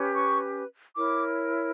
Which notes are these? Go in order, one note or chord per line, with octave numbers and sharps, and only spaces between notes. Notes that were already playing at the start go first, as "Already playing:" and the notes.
Already playing: C#4 G4 B4
C#6
E4 A#4 C#5 D6